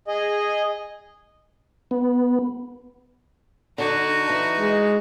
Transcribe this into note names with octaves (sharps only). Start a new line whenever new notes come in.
G#4 D#5
B3
D3 D4 D#4 F#4
E3
G#3